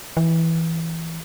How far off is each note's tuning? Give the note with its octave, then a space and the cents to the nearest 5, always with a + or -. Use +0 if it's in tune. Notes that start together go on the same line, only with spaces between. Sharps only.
E3 -5